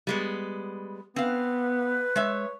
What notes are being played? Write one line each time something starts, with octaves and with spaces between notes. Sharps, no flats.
G3 G#3 B3
B3 C4 B4 F5
G#3 C#5 E5